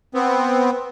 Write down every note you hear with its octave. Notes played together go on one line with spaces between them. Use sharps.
B3 C4